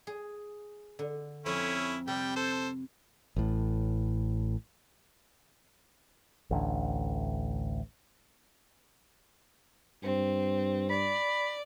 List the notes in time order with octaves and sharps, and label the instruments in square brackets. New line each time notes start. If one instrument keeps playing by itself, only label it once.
[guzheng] G#4
D3
[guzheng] F2 C4 G#5 [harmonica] C#4 E4
[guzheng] C3 [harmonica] G3 G5
[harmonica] A4 C5
[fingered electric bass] A1 A2
A1 D2 D3
[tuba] G2 [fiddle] C4
[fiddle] D5 [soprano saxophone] B5